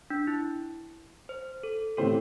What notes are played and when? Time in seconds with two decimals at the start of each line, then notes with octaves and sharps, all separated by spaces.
0.10 D4
0.27 E4
1.29 C5
1.63 A4
1.97 A2 E3 C4 G4 A4 C5